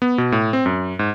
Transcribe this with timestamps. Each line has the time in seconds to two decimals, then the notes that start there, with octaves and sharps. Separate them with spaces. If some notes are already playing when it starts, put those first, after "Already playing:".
0.02 B3
0.18 B2
0.32 A2
0.53 C4
0.66 F#2
0.99 G#2